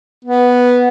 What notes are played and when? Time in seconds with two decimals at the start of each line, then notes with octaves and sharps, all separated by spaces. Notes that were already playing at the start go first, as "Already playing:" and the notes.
0.25 B3